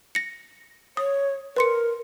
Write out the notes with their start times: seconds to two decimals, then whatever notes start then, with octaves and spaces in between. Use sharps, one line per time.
0.15 A#6 C#7
0.97 C#5 D#6
1.56 A#4 B4 C6 C#7